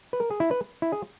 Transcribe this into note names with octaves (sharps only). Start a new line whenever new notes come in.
B4
A#4
G#4
E4
B4
E4
G#4